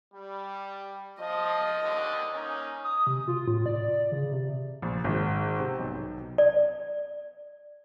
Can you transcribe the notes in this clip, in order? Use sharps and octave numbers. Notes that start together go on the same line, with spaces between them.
G3
F3 D#5
D#2 D3
A#3 C#4 D#4
D#6
C3
F4
A2
D5
C#3
C3
A#1
G#1
C3
B1
D5